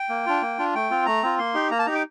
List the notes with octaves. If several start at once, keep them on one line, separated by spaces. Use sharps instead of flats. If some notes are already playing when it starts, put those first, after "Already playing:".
Already playing: G5
A#3
D4 F4
A#3
D4 F4
A3 G5
C4 F4
A3 A#5
C4 F4
A#3 C6
D#4 G4
A#3 A#5
A5
D#4 G4 A#5
D6